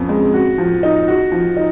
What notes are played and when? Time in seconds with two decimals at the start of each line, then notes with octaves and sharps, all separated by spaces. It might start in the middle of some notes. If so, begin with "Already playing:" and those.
Already playing: F2 B3 C#4
0.09 G#3
0.34 F#4
0.58 F3
0.83 D#4
1.08 F#4
1.32 F3
1.57 D#4